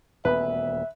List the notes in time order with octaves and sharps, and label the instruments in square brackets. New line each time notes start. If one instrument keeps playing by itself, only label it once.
[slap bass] D#1 D2 B3 [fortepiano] B4 [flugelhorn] E5